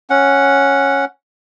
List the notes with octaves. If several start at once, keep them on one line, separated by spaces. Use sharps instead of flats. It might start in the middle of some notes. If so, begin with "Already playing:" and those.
C#4 F#5